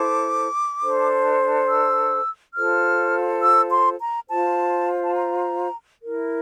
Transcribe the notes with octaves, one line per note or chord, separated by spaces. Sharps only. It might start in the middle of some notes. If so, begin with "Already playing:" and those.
Already playing: E4 A4 C5 D6
D4 A4 C5
E6
F4 A4 C5 F6
E6
C6
A#5
F4 C5 A5
A5
A#5
E4 A#4